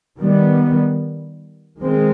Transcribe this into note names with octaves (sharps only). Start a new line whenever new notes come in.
D#3 G3 B3
D#3 G#3 C4